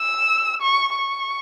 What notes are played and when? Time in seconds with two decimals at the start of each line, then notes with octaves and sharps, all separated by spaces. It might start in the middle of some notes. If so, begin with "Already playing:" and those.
Already playing: E6
0.62 C#6
0.96 C#6